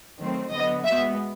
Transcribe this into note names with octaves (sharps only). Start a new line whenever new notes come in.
D#3 F#3 A3 C4
D3 F#3 B3 D#5
B2 G#3 B3 E5